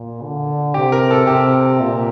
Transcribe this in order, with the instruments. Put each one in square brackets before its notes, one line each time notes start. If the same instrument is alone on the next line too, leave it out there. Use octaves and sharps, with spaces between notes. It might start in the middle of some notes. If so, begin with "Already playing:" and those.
Already playing: [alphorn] A#2
D3
[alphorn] C3 [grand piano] G4
[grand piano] A#4
A4
[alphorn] C3 [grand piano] G4
[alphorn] A#2